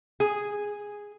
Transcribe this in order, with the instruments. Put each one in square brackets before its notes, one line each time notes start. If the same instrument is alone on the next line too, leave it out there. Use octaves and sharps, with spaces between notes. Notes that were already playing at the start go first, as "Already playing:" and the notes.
[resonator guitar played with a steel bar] G#4